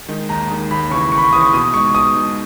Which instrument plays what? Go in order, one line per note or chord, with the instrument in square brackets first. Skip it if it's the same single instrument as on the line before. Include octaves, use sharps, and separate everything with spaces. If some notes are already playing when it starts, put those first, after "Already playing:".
[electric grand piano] D#3 G#3 D#4
[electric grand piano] D#2 [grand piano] A#5
[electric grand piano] D#3 G#3 D#4
[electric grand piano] D#2 [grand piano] B5
[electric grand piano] C#3 [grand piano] C#6
[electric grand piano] E3
[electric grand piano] D#2 [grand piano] C#6
[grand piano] B5
C#6
[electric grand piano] C#3 [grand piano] D#6
[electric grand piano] E3
[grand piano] C#6
[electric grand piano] B2 [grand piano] D#6
[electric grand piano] G#3 D#4 [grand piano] C#6
[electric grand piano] B2 [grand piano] D#6
[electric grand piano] G#3 D#4